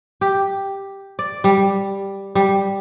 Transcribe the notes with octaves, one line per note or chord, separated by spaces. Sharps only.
G4
D5
G3
G3